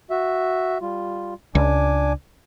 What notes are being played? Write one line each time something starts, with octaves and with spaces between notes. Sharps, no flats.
F#4 E5
G3 F4
C#2 D4 G#5 D6